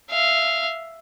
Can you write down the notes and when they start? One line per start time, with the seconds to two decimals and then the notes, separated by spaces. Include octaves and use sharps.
0.11 E5 F5